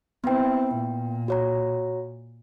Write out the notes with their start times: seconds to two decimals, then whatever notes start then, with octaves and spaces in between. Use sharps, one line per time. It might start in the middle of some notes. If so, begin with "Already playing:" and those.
0.24 B3 C4 E4 G5
0.75 A#2
1.28 F#4 C#5 A#5